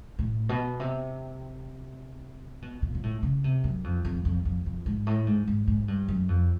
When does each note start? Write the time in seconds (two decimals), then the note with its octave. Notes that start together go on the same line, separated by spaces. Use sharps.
0.19 A2
0.49 B2
0.80 C3
2.62 B2
2.82 A#2
2.95 A#2
3.03 A2
3.23 C#3
3.44 C3
3.64 F#2
3.84 F2
4.05 F2
4.25 F2
4.45 F2
4.66 F2
4.86 G#2
5.07 A2
5.27 G#2
5.48 G#2
5.67 G#2
5.88 G2
6.08 F#2
6.29 F2